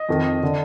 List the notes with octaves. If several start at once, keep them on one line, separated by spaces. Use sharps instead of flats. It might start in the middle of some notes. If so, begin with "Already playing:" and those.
Already playing: D#5
F2 D#3
D3